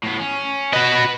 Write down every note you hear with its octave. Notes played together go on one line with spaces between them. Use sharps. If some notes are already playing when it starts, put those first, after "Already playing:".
A2 B3
C#4
F#4 B4 D#5